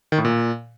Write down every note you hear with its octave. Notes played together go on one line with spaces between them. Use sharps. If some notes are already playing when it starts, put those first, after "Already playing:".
D#3
A2
A#2